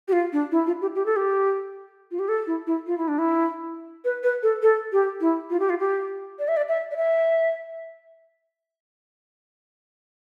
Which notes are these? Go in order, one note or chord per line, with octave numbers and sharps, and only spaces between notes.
G4
F4
D4
E4
F4
G4
G4
A4
G4
F4
G4
A4
E4
E4
F4
E4
D4
E4
B4
B4
A4
A4
G4
E4
F4
G4
F4
G4
D5
E5
D5
E5
D5
E5